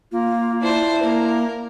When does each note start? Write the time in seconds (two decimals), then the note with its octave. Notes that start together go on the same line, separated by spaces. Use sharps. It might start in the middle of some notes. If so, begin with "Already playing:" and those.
0.12 A#3 F4
0.61 D4 E4 C5
1.02 A#3 A#4